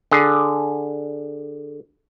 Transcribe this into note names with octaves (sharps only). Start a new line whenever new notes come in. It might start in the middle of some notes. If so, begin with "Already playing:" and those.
D3 G#4